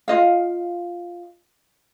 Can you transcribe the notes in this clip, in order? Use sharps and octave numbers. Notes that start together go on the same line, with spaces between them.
F4 D#5 F5